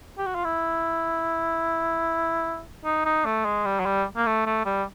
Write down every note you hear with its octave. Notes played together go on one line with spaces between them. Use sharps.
G4
F#4
F4
E4
D#4
D#4
A3
G#3
G3
F#3
G3
A#3
A3
A3
G3